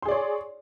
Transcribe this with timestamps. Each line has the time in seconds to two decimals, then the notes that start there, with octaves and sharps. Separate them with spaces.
0.02 C6
0.05 G#4
0.08 D5
0.11 C#5